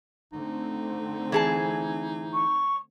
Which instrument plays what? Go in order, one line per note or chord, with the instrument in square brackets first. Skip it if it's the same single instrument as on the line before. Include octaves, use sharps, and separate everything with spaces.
[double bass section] D3 A3 C4 [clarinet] D#4
[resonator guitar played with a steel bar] E3 G#4 A5
[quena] C#6